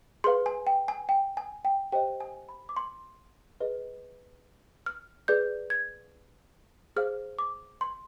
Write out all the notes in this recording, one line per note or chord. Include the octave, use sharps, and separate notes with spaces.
G#4 B4 F5 C6
G#5
G5
G#5
G5
G#5
G5
G4 C5 D#5 G5
G#5
B5
D6
C6
G#4 B4 D#5
F6
G#4 B4 D5 G6
G#6
G#4 C5 F5 F6
D6
C6